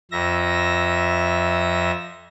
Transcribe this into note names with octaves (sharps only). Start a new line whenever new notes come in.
F2 E5 A#6